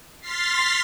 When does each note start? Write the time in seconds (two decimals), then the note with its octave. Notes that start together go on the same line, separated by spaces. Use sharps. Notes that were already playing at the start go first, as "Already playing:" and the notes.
0.20 C6 F6 A6 B6 C7